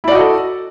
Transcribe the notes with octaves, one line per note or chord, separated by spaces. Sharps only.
E4 F#4 A4 D5 D#5